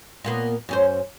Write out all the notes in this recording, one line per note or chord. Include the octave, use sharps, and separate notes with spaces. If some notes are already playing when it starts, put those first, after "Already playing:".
A#2 A#3 B3
F#2 C#4 C5